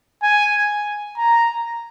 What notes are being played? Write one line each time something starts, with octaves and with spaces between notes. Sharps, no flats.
G#5
A#5